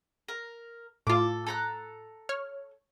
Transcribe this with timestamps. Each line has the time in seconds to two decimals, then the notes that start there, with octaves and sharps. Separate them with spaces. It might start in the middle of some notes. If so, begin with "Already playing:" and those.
0.28 A#4
1.07 A2 F4 A4 D6
1.47 A4 A#5 F#6
2.29 C#5 F6